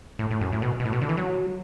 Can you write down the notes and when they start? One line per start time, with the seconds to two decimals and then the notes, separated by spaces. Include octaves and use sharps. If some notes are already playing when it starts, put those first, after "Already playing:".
0.19 A2
0.31 A2
0.41 F#2
0.52 A2
0.62 B2
0.80 B2
0.85 A2
0.93 B2
1.01 D3
1.09 E3
1.17 F#3